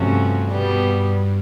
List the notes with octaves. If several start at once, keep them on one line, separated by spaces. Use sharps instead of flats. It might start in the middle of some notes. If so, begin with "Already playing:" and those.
Already playing: G2 C3 F3 A3 C#4 F#4
B2 G3 B3